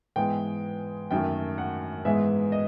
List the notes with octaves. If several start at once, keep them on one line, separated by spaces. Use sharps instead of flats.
G#2 E3 G#3 B3 G5
F#2 D#3 F#3 A3 G5
F#5
G#2 E3 G#3 B3 E5
D#5